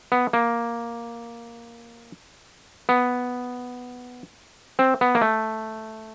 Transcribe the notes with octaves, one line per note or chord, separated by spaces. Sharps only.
B3
A#3
B3
C4
B3
A#3
A3